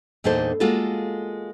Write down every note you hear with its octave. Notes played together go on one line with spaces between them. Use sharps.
E2 A#2 D4 D#4 A4 C5
G#3 A#3 F4 F#4 A4